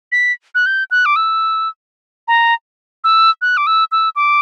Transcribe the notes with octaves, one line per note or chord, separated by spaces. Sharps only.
B6
F#6
G6
F#6
D6
E6
A#5
E6
F#6
D6
E6
E6
D6